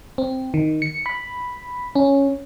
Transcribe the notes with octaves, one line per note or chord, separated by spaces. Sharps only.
C4
D#3
C#7
B5
C#4